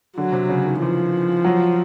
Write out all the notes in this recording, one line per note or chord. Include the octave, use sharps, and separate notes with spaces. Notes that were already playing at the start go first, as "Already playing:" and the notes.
D3 F#3
C3
C#3
D#3
E3 F3
F#3